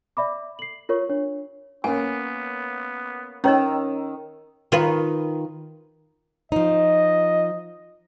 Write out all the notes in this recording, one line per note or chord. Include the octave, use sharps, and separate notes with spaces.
D5 E5 B5 D6
C7 F#7
F4 A#4 C#5 C#6
D4 C#5
A#3 B3 C#4 G#5
D#3 C#4 C#5 D#5 A#5 E6
D#3 F4 B4
F3 D#4 D#5